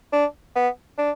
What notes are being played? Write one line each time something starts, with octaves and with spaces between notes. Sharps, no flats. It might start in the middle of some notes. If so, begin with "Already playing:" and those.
D4
B3
D4